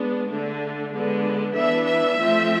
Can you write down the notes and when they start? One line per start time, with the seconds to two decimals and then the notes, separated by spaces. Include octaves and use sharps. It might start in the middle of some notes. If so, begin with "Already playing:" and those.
Already playing: G#3 B3 D4
0.29 D3 A3 D4
0.93 D3 G#3 B3 D4
1.55 E3 B3 D4 E5
1.86 E5
2.18 F3 A3 C4